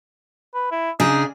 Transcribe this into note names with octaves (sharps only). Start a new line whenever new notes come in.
B4
E4
C#3 D4 D#4 G#4